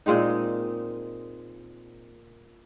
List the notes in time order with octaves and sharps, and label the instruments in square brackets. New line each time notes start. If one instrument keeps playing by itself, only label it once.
[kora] A#2 G#3 C4 D#4